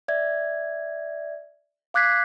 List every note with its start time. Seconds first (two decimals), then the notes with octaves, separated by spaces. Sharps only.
0.08 D5 E5 G#6
1.94 F5 D6 F#6 G#6 B6 C7